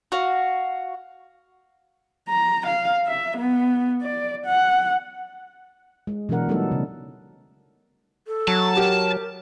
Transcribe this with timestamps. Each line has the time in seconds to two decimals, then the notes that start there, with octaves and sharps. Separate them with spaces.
0.12 F#4 F5
2.28 A#5
2.67 F5
3.07 E5
3.37 B3
4.02 D5
4.46 F#5
6.07 G#3
6.29 B2 E3 F#3 D4 A#4 F#5
6.49 F#3 G3 A3 B3 D#4 A4
6.72 C#3
8.27 A4
8.48 F#3 A5
8.77 G4 A#4